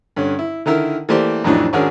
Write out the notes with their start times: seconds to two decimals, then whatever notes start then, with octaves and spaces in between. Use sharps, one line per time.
0.16 G2 D3 C#4
0.39 E4
0.66 D3 D#3 E4 A#4 E6
1.09 E3 A3 A#3 G4 C5 D5
1.44 F2 A2 E3 F#3 D4 D#4
1.73 G#1 C#4 D4 F#4 G#4 A#4